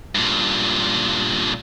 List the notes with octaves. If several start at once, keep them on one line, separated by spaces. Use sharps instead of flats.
G2 A#2